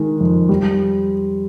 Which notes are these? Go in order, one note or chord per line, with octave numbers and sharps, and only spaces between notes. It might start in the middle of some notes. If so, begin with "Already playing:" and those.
Already playing: D#3 G#3
F2
G3